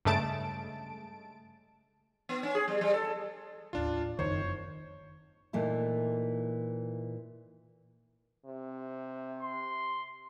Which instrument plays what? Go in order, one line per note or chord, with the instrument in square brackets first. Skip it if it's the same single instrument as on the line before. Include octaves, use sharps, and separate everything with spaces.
[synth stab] G2 C#3 G#3 A3 A5 D7
[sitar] B3
C#4
G#4
G3
G3
A4
[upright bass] A1 D#2 [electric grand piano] D4 F4
[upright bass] F#1 F2 [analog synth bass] D#3 [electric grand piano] C5 [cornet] C#5
[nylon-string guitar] A#2 E3 A3 D#4
[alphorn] C3
[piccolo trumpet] C6